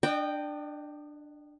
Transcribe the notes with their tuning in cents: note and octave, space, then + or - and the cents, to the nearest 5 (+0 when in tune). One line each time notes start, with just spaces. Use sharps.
D4 +15 D#5 -30 G5 +0